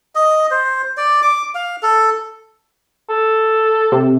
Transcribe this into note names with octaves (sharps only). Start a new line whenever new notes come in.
D#5
C5
D5
D6
F5
A4
A4
C3